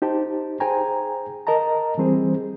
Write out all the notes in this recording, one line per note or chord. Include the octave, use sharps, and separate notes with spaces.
D#4 G4 C5 A5
G#4 C5 G5 G#5 A#5
A#4 D#5 A5 A#5
E3 G3 C4 G#4 C5